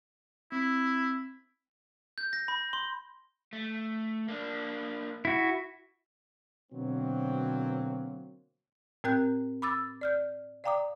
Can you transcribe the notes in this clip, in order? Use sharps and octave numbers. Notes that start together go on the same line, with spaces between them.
C4 E4
G6
A#6
B5
C6
A3
A#3 D4
E4 F#4
B2 D3 F#3 A#3 C4
A2 C4 A#4 G5 F#6 G6
B5 D6 E6 A6
D5 F6 G6
D5 F5 G5 A#5 D6 D#6